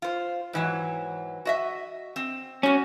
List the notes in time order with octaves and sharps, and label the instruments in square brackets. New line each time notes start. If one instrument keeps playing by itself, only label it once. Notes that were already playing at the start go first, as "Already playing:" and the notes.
[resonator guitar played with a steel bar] F4 C5
G#2 E3 F#3
F#4 D#5 E5
C4
[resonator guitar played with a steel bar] G3 F#4 [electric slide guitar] C#4